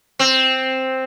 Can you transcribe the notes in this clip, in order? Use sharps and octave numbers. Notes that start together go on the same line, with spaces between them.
C4